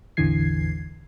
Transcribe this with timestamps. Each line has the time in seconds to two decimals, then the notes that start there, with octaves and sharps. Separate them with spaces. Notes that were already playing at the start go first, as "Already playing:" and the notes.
0.17 A1 E2 D3 E3 G#6 C7